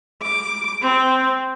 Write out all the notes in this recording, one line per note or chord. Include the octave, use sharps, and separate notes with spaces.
D6
C4